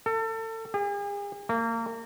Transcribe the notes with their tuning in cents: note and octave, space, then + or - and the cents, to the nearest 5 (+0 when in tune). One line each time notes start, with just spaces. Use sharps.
A4 +30
G#4 -45
A#3 -30